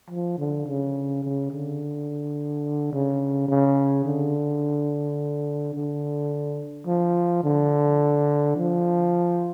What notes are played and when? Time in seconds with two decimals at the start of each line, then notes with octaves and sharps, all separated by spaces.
0.10 F3
0.39 D3
0.67 C#3
1.23 C#3
1.51 D3
2.93 C#3
3.48 C#3
4.05 D3
5.74 D3
6.87 F3
7.44 D3
8.56 F3